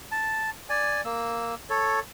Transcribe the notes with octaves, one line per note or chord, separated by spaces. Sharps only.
A5
D5 G#5
A#3 E6
A4 C#5